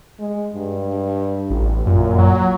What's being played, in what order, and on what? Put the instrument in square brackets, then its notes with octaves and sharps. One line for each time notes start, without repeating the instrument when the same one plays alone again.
[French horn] G#3
G2
[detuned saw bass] A1
[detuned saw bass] F#2 [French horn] A#2
[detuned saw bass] F#3